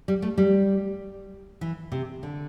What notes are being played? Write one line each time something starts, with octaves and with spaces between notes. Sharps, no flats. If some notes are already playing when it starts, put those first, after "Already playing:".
G3
A3
G3
E3
C3
D3